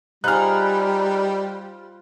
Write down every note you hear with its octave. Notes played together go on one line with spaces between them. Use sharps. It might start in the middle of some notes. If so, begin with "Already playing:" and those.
G3 D#4 F4 G#4 C5 B5 F6 F#6